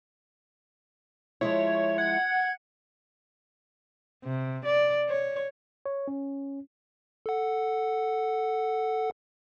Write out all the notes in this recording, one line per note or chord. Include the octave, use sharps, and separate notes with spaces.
F3 G#3 E4 C#5
F#5 G#6
C3
D5
C#5
C#5
C#4
A4 F#5